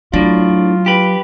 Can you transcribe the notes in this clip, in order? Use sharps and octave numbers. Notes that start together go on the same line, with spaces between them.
A2 F#3 D4 F4
G4 B4